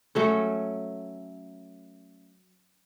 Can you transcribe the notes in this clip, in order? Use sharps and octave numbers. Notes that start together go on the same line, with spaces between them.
F#3 A3 C#4